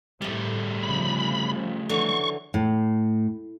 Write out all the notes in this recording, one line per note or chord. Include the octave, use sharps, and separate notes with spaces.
A2 C3 G3 A3 D#5
C#3 F3 B5
D3 E3 F#3 C#6
A2